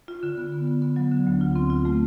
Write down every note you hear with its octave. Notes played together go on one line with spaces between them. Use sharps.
F4
D3
B3
B3
D3
B3
F#3
D3
D2
F4
C4
F4
A3